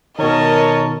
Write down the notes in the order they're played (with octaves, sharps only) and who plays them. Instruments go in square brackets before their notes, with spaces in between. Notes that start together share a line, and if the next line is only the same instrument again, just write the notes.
[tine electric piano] B2 D#3 [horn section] A#4 C#5 [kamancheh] D#5 A5